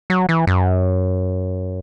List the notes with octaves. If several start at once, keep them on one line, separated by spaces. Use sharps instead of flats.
F#3
E3
F#2